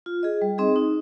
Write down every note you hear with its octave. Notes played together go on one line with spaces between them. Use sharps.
F4
G#4 D#5
G3
C4 D#4 G#4 D#5
D#4